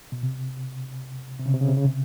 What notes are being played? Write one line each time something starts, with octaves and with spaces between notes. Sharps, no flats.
B2
C3
C3
C#3
C3
C#3
C3
C#3
C3